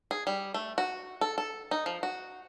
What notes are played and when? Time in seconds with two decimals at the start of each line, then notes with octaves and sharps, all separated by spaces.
0.11 G#4
0.27 G3
0.54 A3
0.78 F#4
1.21 A4
1.38 A4
1.71 D#4
1.86 F3
2.03 F#4